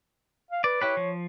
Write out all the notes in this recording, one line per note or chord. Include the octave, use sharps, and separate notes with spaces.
F5
B4 D5
E4 G4 B4 C#5
F3